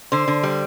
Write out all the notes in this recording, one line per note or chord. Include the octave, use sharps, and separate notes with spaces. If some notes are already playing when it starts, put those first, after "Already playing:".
D3 C5
D3
G3